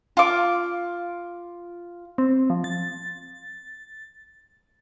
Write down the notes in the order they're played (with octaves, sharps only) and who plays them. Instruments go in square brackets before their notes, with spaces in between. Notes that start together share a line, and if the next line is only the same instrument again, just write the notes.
[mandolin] F4 D6
[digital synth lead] C4
F3
A6